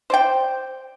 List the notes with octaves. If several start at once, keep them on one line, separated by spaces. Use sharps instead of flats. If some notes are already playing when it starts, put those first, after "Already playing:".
C5 D5 G5